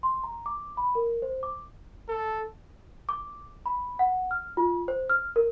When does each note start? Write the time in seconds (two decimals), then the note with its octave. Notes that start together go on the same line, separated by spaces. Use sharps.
0.03 C6
0.24 A#5
0.46 D6
0.77 B5
0.95 A#4
1.22 C5
1.43 D6
2.08 A4
3.09 D6
3.66 B5
3.99 F#5
4.31 F6
4.57 F4
4.88 C5
5.10 F6
5.36 A#4